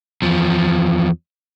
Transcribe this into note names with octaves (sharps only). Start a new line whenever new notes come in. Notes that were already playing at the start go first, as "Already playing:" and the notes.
E2 F3